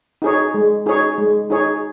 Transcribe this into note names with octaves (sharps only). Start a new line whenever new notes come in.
D#4 G#4 C#5
G#3
D#4 G#4 C#5
G#3
D#4 G#4 C#5